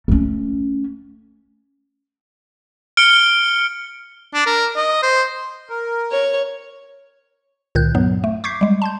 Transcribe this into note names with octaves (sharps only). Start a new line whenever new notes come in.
A3 C#4
F6 C#7 D7 G7
D4
A#4
D#5
C5
A#4
C#5
C#2 A#2 D#3 F#6 G6
G2 F#3 B3
A3
C#6 D6 G6 G#6 B6 C7
G3 G#3
A5 C6 G6